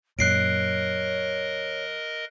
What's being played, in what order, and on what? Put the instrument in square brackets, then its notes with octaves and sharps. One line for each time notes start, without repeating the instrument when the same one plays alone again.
[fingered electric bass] F#2 A#2 [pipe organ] A#4 D#5 [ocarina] C#5 [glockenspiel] F#6 C7 D7